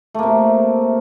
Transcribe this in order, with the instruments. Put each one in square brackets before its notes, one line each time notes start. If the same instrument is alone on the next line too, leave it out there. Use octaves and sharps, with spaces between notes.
[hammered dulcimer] A3
A#3
C3